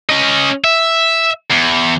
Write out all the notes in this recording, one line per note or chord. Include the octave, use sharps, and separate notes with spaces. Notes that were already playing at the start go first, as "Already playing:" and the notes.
C#4 D#5
E5
E2